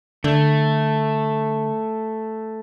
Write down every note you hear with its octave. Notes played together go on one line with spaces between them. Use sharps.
D3 A3